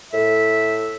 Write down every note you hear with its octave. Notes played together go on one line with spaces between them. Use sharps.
A2 E5